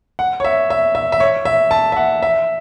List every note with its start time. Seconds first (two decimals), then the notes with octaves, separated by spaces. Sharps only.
0.19 F#5
0.40 C#5
0.44 E5
0.70 E5
0.95 E5
1.12 E5
1.20 C#5
1.45 E5
1.71 A5
1.92 E5
1.97 F#5
2.23 E5